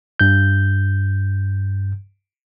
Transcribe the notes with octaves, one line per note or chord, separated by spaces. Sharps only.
G2 G6